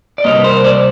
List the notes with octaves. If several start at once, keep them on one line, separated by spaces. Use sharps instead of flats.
D5
C2 A#2 G3 A#3 C#5 D#5
B4
A#4 C5
C5 D5